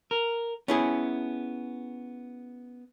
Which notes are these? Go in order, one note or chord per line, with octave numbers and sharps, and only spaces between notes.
A#4
B3 C#4 E4 G#4